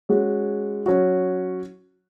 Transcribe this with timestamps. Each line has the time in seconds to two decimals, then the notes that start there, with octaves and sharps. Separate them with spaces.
0.09 G#3 C#4 F#4
0.86 F#3 C#4 F#4